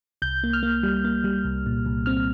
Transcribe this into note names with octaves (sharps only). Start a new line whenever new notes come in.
C2 G6
A#3
F6
A#3
G3
A#3
G3
C2
A#2
C2
C4 F6